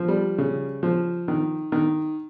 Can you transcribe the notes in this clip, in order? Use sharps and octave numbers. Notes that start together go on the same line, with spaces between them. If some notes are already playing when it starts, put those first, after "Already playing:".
Already playing: F3
G3
C#3
F3
D#3
D#3